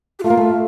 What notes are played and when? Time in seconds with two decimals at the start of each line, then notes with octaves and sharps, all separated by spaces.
0.19 G4
0.24 A3 F4
0.30 A#3
0.37 A3